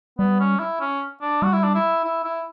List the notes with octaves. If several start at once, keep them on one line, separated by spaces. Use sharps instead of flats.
G3 B3
C#4
E4
C#4
D4
G3 F#4
E4
D4
E4
E4
E4